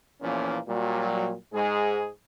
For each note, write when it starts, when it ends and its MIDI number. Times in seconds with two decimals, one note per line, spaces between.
0.22 0.58 40
0.22 0.58 46
0.22 0.58 52
0.22 0.58 53
0.22 0.58 58
0.22 0.58 61
0.68 1.34 46
0.68 1.34 54
0.68 1.34 55
1.54 2.08 44
1.54 2.08 56
1.54 2.08 68